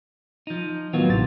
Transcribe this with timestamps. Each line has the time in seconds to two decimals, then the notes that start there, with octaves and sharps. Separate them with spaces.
0.47 F3 D#4
0.93 A2 D#3 F#3 B3 F4
1.09 G#1 A2 C3 A6